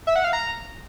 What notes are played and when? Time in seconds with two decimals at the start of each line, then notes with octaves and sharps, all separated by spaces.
0.07 E5
0.16 F#5
0.24 F5
0.33 A#5